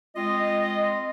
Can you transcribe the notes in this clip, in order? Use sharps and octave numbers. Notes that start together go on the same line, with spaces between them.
G#3 C4 F4 D#5